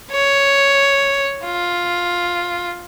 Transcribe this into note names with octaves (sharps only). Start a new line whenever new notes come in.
C#5
F4